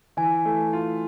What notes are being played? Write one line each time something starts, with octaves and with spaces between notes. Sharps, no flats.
E3 G#5
A3
F4